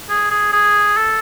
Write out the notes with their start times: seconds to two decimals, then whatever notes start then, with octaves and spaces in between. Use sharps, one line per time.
0.09 G#4
0.31 G#4
0.53 G#4
0.97 A4